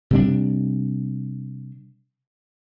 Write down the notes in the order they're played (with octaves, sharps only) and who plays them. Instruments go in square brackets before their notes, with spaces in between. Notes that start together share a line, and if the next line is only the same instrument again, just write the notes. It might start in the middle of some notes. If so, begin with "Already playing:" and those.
[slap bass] C3 G3 D4